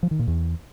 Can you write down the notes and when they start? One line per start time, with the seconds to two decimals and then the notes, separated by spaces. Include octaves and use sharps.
0.03 F3
0.11 D#3
0.19 A#2
0.27 E2